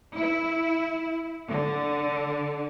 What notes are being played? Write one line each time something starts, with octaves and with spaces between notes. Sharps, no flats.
E4
D3